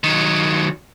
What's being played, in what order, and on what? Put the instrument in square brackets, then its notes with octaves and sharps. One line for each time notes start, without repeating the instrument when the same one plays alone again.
[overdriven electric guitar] D#3 F#3